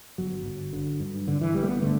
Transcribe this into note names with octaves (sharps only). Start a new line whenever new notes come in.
G1 F#3
G1
D3
G2
G1 D3
E3
G1 G3
A3
B3
D3 A3